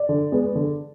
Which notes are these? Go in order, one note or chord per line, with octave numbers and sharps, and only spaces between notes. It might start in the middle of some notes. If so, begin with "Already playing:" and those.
Already playing: D5
D3
G#3 B3
D3